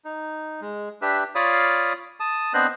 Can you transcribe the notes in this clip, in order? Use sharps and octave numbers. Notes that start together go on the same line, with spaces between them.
D#4
G#3
D4 G4 B4 E5
F4 C#5 D5 F5 B5 D#6
A5 D#6
B3 C4 D4 C5 D#5 F#6